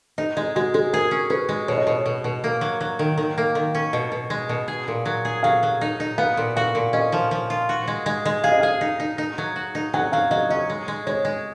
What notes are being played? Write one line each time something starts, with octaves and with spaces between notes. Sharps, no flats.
D#4 D#5
G#3 D#5
G#3 F#4
G#3 G#4
G#4 A#4
C#4
C#4 B4
G#3
B2 C#5
D#5
B2 C#5
B2
B2
A#3
F#3
F#3
D#3
D#3
A#3
D#3
C#4
B2 D#5
B2
G#3
B2
G#4
A#2
F#3
G#4
F#3 F5
F#3
D#4
D#4
B3 F5
A#2
F#4 F5
A#2
C#4 D#5
F3
F3
F4
F#4
G#3
G#3
G#3
G#4 F5
D#5
G#4 F5
D#4
D#4
D#4
F#3
F#4
D#4
F#3 F#5
F#3 F5
F#3 D#5
C#4 D#5
G#3
G#3
G#3 C#5
G#3